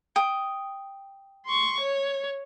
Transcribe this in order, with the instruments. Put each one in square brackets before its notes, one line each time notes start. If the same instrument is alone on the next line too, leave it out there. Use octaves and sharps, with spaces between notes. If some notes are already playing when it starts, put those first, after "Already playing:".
[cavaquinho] G5 D#6
[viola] C6 C#6
C#5